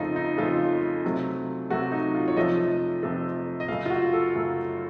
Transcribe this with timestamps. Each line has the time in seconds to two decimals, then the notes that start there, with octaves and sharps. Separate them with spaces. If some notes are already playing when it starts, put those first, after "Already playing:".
Already playing: F2 C#3 A3 D#4 F4
0.16 D#4
0.38 F2 C#3 A3 F4
1.05 C3 F#3 A3
1.70 C3 F#3 A3 F#4
1.92 D#4
2.15 F4
2.28 C#5
2.36 F2 C3 F3 A3 D#5
3.03 F2 C3 F3 A3
3.60 D#5
3.68 F#2 C#3 A3 F5
3.86 F4
3.90 F#4
4.13 A4
4.35 F#2 C#3 A3